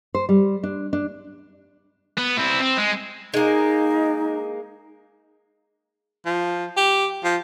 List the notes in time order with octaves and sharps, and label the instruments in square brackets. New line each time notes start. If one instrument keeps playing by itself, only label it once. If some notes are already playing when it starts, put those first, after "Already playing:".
[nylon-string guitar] C5
G3
D4
D4
[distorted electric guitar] B3
C4 E4
C4
G#3
[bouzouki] G#3 A#3 [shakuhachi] D#4
[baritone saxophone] F3
G4
F3